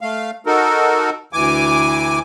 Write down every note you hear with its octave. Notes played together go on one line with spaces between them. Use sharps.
A3 F5
D#4 F#4 A4 A#4
D2 E3 G#5 D6